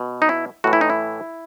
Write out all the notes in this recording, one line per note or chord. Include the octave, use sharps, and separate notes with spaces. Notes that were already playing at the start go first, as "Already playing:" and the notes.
Already playing: B2
D#4
E4
A2 E3 F#4
E4
D#4
E4